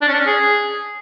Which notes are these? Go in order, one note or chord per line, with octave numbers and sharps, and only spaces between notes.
D4
C#4
D4
C#4
G#4